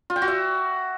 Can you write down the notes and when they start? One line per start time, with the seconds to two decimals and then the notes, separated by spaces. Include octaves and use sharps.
0.10 F4
0.16 G5
0.22 F#4
0.28 E5